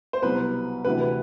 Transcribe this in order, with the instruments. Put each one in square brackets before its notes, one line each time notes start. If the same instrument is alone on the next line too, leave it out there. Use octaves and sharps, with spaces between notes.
[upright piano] C5
C2 B2 F#3 B4
D2 C3 E3 B4
B4